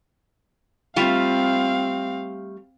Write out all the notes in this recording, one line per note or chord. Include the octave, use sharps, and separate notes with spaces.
G3 A3 C4 F4 F5